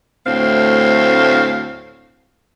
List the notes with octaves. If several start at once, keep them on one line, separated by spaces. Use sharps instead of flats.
D2 A2 C4 F5